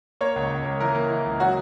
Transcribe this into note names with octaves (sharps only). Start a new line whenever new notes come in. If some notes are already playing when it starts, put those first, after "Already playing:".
A#3 C#5
C#2
C#2
A#3
E3 A#4
A#3
E3
C#2
F#3 F#4